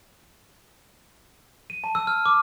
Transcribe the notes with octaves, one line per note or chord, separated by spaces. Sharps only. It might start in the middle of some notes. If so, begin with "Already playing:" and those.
D#7
A5
E6
F6
D6